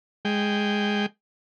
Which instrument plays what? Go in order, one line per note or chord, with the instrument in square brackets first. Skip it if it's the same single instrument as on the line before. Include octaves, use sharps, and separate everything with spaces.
[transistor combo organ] G#3 G5